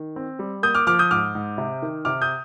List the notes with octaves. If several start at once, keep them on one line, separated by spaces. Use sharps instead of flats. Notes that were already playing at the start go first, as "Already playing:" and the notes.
Already playing: D#3
C4
G3
A#3 D#6 G6
D6 F6
F3 D6 F6
D#6 G6
G#2 D6 F6
G#2
C3
D#3
C3 D6 F6
D#6 G6